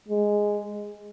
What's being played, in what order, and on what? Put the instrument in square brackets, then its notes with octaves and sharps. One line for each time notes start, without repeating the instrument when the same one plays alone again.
[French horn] G#3